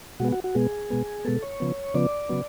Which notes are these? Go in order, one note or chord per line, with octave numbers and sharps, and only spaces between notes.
B2 G#3 B3 F#4
F#4
F#4
B2 G#3 B3 G#4
B2 G#3 B3
B2 G#3 B3 A4
C#5
C#3 F3 B3
C#3 F3 B3 D5
C#3 F#3 B3